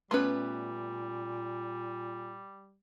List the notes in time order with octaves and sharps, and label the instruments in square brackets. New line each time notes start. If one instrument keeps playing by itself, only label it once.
[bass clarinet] A#2 [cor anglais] G3 [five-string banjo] A3 B3 B4 [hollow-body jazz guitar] C#4 C6